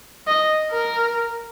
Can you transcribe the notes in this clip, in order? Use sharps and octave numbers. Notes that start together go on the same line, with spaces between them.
D#5
A#4